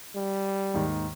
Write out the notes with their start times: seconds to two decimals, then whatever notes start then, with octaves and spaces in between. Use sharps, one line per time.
0.15 G3
0.74 D#2 G#2 D#3